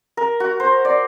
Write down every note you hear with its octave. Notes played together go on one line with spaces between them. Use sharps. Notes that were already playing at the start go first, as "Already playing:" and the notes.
A#4
F#4
C5
D5